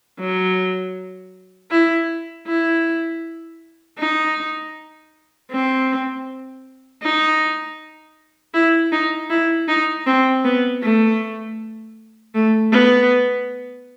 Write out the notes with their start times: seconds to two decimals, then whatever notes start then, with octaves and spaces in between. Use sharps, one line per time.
0.20 F#3
1.71 E4
2.47 E4
3.99 D#4
5.51 C4
7.03 D#4
8.54 E4
8.92 D#4
9.30 E4
9.68 D#4
10.07 C4
10.45 B3
10.83 A3
12.34 A3
12.72 B3